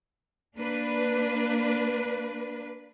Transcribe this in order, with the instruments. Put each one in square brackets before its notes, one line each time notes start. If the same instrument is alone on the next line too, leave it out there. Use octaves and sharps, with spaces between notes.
[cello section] A#3 D4 B4